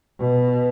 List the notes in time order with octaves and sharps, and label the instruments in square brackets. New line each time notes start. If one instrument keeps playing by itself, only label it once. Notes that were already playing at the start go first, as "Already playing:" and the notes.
[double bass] B2